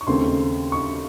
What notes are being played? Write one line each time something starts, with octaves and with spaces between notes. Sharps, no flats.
C#6
D#2 C#3 A3 C4 C6
C#6